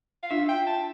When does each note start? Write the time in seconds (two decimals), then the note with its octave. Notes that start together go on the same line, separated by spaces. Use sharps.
0.23 F5
0.30 D4 F4 E5
0.49 G5
0.66 A5